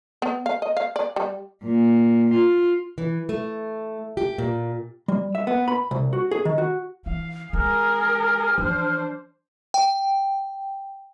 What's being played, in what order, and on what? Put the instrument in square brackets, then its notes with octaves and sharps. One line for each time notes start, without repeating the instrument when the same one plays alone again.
[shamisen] B3
F5
D#5
F5
D5
G3
[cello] A#2
F4
[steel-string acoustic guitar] E3
A3
G4
A#2
[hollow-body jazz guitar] G3
E5
B3
B5
C2
F#4
G#4
D#3
F#4
[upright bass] E3 [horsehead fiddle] F5
[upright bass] G#3 [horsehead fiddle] G#4 A#4 [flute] F6
[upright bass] E3 F3 [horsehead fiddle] D4 C5
[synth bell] G5